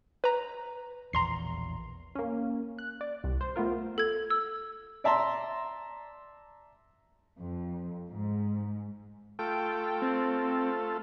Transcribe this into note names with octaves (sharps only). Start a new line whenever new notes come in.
B4 A#5
E1 A#1 E2 A#5 C6 C7
A#3 C#4
F#6
D5
C2
C5
A3 B3 F4 A#4
A4 G#6
E6
D5 E5 A5 A#5 C6
F2
G#2
A3 F4 A4 G5
C4